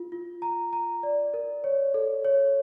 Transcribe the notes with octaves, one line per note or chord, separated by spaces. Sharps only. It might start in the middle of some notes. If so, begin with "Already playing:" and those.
Already playing: F4
F4
A#5
A#5
D5
A#4
C#5
A4
C#5